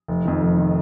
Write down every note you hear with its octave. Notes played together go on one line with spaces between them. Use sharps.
F1
F2 D#3
F1
D#3